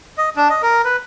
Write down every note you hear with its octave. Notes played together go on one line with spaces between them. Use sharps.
D#5
D4
D#5
A#4
B4